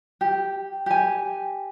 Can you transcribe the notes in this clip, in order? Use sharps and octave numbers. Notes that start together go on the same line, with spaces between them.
G4
G4 G#5